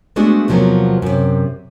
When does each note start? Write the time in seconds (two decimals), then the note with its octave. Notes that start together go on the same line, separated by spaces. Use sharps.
0.16 G#3 A3 B3 D4 F#4 G#4
0.48 E2 C3 F3 F#3 A#3 B3
1.02 F#2 C3